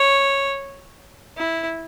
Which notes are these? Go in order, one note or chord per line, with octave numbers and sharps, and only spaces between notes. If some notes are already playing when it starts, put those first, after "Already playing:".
Already playing: C#5
E4